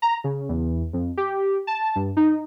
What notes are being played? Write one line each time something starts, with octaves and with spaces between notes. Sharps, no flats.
A#5
C#3
E2
F2
G4
A5
G2
D#4